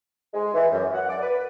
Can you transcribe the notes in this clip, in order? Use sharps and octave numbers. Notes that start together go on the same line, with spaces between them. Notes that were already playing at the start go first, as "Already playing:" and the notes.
G#3
E3
F#2
F#5
D5
B4